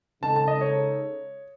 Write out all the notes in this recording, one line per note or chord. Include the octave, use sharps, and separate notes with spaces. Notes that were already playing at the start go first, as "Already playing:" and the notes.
C#3 G#3 D#4 A4 A5
A5
D#5
C#5